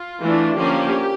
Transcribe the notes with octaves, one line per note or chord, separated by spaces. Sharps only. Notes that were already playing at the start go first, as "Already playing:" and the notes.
Already playing: F4
E3 A3 D4
D3 F3 A#3 C#4 G4